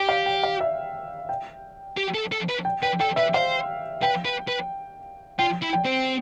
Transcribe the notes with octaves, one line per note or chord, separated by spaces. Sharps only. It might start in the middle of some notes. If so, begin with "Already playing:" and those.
Already playing: G4 G5
F5
G5
F5
E5
G5
G4
A4
A4
B4
G5
B4 G5
A4 G5
B4 E5
C5 F5
B4 G5
B4
B4
F4 G5
E4
G5
C4